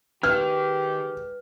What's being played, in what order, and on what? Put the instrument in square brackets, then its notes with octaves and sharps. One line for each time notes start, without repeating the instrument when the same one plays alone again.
[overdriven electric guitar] D#3 [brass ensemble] G#3 G4 [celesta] B4 [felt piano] F6